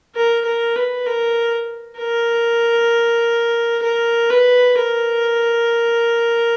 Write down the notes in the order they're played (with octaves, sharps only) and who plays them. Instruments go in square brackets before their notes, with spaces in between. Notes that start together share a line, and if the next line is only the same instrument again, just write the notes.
[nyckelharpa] A#4
A#4
B4
A#4
A#4
A#4
B4
A#4